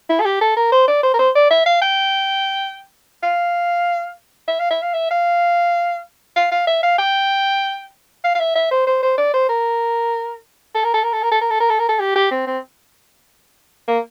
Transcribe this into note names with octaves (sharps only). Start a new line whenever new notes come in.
E4
A4
G4
A4
A#4
C5
D5
C5
A#4
C5
D5
E5
F5
G5
F5
E5
F5
E5
F5
E5
F5
F5
F5
E5
F5
G5
F5
F5
E5
E5
C5
C5
C5
D5
C5
A#4
A4
A#4
A4
A#4
A4
A#4
A4
A#4
A4
A#4
A4
A#4
A4
G4
G4
C4
C4
A#3